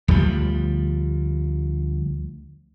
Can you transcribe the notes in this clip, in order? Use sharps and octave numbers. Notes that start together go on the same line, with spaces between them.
D2 F3 G3